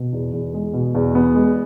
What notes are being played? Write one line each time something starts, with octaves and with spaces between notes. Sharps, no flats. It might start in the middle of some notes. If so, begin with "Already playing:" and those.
Already playing: B2
E2
E2
G#3
B2
E2
B3
G#3